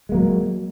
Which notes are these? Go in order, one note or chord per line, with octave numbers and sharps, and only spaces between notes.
F#3 G#3 A#3